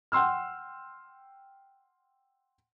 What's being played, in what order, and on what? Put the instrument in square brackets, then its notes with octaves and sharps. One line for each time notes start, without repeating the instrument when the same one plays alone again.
[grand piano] F#5 G5 C6 E6 F6